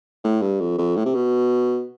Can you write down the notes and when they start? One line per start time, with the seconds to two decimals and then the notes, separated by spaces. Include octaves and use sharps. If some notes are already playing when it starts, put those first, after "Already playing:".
0.24 A2
0.42 G2
0.61 F2
0.78 F2
0.97 A2
1.05 C3
1.15 B2